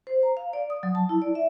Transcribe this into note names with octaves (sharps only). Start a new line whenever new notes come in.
C5
A#5
F5
D5
D#6
F#3
A5
E4
D5
E5